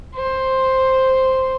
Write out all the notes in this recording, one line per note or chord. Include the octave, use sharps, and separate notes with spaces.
C5